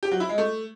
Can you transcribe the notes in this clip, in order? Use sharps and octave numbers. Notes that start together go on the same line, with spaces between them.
G4
F#3
E4
G#3
A3